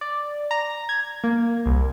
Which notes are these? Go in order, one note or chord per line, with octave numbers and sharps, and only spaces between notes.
D5
A#5
G#6
A#3
C2